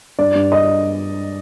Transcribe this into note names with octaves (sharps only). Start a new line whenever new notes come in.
G2 D5
G2
D#5